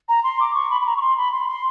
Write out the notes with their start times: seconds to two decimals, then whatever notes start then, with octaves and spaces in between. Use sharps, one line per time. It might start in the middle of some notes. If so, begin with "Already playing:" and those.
0.09 A#5
0.24 C6
0.40 D6
0.54 C#6
0.70 B5
0.81 B5
0.86 A#5
0.97 C#6
1.01 C6
1.17 B5
1.32 C6
1.43 B5
1.48 C6